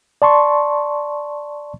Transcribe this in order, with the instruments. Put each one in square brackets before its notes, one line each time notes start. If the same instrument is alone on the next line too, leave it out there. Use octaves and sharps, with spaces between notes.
[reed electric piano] D5 A5 C6 C#6